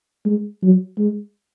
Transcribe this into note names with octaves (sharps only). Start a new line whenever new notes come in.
G#3
F#3
G#3